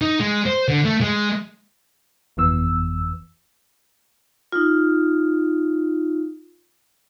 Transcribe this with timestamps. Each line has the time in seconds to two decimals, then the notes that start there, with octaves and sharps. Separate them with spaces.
0.01 D#4
0.20 G#3
0.46 C5
0.68 D3
0.85 A3
1.01 G#3
2.37 G1 F2 E3 B3 E6
4.52 D#4 F4